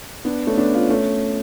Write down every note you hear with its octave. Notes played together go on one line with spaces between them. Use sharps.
B3 D4
A3 C#4
B3 D4
C#4 F4
A3 C#4